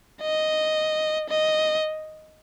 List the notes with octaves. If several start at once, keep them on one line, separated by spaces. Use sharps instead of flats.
D#5
D#5